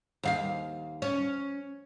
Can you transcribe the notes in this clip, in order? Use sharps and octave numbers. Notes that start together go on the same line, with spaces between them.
D#2 F4 F5
C#4